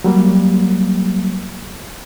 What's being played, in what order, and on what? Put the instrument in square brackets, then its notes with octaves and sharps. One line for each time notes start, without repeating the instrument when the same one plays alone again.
[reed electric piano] F#3 G3 A#3